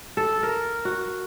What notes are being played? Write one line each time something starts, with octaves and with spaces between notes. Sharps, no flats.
A4
A#4
F#4